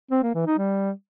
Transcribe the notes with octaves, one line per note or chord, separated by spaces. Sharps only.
C4
A#3
E3
D#4
G3